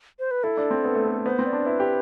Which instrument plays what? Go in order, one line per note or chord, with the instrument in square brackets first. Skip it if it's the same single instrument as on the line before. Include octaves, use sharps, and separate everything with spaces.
[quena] C5
B4
[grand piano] E4 [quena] A4
[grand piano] D4
C4
B3
A3
B3
[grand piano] B3 [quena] C5
[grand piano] C4
[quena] D5
[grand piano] D4
[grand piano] E4 [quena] B4
[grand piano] G4